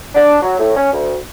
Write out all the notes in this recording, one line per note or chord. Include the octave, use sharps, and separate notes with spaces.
D4
F#3
A2
C#4
D2